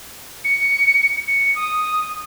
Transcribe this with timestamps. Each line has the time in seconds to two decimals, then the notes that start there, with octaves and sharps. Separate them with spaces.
0.44 C#7
1.27 C#7
1.55 D#6